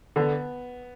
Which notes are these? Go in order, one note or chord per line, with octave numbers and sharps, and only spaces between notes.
D3 B3